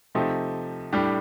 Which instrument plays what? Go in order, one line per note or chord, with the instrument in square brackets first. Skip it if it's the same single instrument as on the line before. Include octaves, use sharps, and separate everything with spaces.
[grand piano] C3 F3 A3 D#4 G4
A2 G3 D4 G4